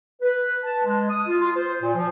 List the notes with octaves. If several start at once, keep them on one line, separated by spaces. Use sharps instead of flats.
B4
A5
G#3
D#6
F4
F4
C5
A#2
F3